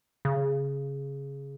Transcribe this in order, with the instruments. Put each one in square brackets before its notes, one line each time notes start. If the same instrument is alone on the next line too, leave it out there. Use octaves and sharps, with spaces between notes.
[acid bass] C#3